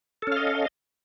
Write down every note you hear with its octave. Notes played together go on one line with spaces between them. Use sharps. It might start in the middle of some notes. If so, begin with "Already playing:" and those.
C#4 A4 D#5 F5